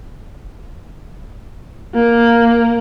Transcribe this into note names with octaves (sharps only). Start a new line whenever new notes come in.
A#3